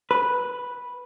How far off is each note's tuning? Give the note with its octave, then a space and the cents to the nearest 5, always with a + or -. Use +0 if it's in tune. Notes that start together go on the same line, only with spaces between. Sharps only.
B4 -5